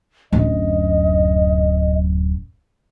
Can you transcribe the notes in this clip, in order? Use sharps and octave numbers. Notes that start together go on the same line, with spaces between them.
D1 F#2 D#5